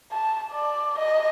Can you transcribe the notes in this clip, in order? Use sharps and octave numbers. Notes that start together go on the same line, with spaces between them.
A5
D5
D#5